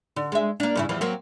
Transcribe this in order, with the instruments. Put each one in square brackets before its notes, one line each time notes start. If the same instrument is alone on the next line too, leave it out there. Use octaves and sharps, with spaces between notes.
[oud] D3
G#3 E5
A#3 D4
G2 C#3 E4
E2 E3 F3
F#3 A#3 C4